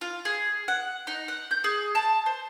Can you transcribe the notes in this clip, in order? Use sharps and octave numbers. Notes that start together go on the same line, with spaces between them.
F4
G#4
F#5
D#4
F#5
G6
G#4
A5
C5